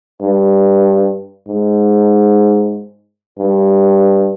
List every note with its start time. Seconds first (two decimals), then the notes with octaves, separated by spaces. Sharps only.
0.21 G2
1.48 G#2
3.38 G2